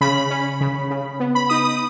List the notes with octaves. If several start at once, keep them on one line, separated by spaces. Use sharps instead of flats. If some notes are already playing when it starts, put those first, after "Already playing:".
C#3 B5
C#4
C#3
C#3
B3
B5
D#4 D#6
D#6